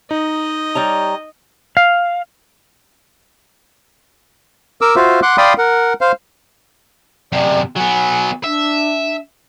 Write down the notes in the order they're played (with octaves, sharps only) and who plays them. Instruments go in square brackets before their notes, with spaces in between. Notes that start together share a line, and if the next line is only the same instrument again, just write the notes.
[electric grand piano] D#4 [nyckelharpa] D#5
[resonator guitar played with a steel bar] G3 C#5 A#5
[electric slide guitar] F5
[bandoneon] A#4 D6 E6
F4 F#4 C5 E5 F5
F#5 C6 D6 F#6
D5 F5 G5 B5 C6 D#6
A#4 F#5
C5 F5
[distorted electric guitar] F#2 C3 [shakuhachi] D5
[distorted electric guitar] F#3 B3 [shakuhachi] G#5
[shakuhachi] D4 [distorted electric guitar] E5